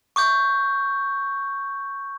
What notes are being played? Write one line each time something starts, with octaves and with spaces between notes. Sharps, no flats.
C#6 D6 G6